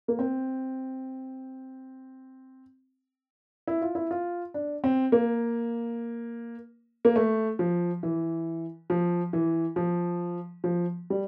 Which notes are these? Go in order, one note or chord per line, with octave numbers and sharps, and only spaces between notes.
A#3
C4
E4
F4
E4
F4
D4
C4
A#3
A#3
A3
F3
E3
F3
E3
F3
F3
G3